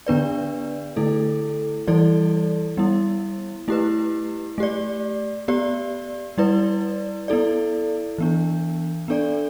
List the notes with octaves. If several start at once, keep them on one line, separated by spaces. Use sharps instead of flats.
D3 B3 D4 B4 D5
D3 A3 E4 A4
E3 G3 E4 A4 D5
G3 B3 E4
A3 E4 G4 B4
A3 G4 D5
B3 G4 D5
G3 E4 B4 D5
B3 E4 A4 D5
E3 B3 D4
B3 D4 A4 D5